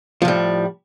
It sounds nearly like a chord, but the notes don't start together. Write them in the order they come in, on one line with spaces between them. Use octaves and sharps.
F3 A2 G3